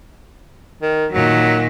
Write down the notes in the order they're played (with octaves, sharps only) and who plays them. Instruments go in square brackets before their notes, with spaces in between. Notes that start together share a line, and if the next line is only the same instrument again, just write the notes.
[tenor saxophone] D#3
[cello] A#2 D#3 [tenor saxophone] F#3